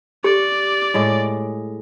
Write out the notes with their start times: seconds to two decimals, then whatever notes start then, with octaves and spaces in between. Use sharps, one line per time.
0.24 G4 D5
0.94 A2 G#3 G#4